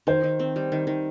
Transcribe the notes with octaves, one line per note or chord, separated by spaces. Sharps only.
D#3 C5
D#3
C4
G3
D#3
D#3